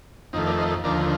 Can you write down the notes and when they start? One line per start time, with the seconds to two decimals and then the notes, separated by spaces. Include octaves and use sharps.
0.33 F2 D#3 A3 C4 D#4
0.46 A#4 D5
0.58 C5 D#5
0.84 D#2 D3 F3 A#4 D5